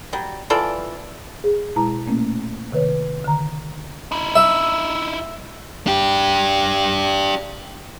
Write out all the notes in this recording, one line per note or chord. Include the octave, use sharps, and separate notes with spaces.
F#3 G3
E3 F4 A4 D5
G#4
B2 G#3 E4 A5 A#5
A#2 A3 A#3 C#4
C3 D#3 B4 C#5
D3 D#3 A#5
D#4 E4
E5
D4 G4